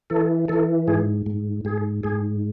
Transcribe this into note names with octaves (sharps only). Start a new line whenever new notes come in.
E3 A4
E3 A4
G#2 G#4
G#2
G#2 G#4
G#2 G#4